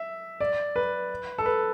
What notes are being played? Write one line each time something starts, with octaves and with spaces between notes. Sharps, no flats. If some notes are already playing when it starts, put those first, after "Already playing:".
Already playing: E5
D5
B4
A4
B4